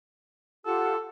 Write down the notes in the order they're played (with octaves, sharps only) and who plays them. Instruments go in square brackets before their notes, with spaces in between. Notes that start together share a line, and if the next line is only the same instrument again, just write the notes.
[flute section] F4 G4 F#5 [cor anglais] A4